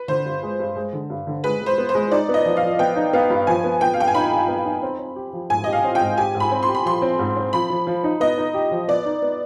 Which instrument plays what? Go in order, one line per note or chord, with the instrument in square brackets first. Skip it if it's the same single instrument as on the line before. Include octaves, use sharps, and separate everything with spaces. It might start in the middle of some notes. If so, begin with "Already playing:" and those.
Already playing: [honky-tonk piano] B4
[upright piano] D3 [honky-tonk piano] C5
[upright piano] G2
G#3
G2
G#3
D3
G2
D3
[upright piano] G#3 [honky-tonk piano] B4
[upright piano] G#3
[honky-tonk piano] C5
[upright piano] B3
[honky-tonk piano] C5
[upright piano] G#3
[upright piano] D#4 [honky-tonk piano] D5
[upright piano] B3
[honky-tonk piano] D#5
[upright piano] F3
[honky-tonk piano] F5
[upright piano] F3
[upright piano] B3 [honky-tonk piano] G5
[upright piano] D#4
[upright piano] B3 [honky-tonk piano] F5
[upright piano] G2
[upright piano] F3 [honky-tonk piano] G#5
[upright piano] B3
[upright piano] B3 [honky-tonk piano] G5
[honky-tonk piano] F5
[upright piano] G2 [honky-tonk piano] G5
[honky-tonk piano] G#5
[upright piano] D#4 [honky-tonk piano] B5
[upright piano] G2
B3
D#4
C4
C4
G4
F3
[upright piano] G#2 [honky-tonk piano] G#5
[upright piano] G4 [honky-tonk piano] D#5
[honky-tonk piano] F5
[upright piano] C4
[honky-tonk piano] G5
[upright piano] G#2
[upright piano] G4 [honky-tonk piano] G#5
[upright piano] G#2
[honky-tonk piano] B5
[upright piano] C4
[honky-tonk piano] C6
[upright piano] G4
[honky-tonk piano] B5
[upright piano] F3 [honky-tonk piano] C6
[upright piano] C4
G#2
C4
[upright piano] F3 [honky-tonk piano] B5
[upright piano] F3
F3
D#4
[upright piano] B3 [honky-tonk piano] D#5
[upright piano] D#4
G4
F3
[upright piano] B3 [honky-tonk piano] D5
[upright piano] D#4
B3